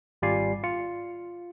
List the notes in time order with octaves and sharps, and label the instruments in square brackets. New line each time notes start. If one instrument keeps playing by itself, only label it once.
[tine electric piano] G#1 G3 F4 D5 G#5 C7
F4 C#7